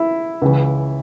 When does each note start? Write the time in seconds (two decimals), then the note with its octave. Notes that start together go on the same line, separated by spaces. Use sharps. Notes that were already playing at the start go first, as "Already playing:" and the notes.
Already playing: E4
0.42 C#2 C#3 E3